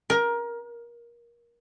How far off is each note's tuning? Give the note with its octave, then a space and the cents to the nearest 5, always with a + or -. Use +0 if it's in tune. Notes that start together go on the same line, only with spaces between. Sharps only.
A#4 +20